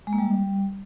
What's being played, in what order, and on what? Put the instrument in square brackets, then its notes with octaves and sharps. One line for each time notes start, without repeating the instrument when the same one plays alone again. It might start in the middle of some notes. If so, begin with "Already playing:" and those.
[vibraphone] G#3
A#3
G3